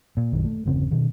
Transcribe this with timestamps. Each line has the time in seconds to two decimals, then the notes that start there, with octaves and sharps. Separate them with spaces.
0.17 A#2
0.33 A#1 F#2 D#3 F#3
0.45 A3
0.66 G1 E2 C#3 C4
0.91 B2 D#3